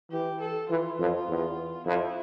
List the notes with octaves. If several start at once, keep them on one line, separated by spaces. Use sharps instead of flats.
E3 G4
A4
E3 F4
F2
E2
F2 E4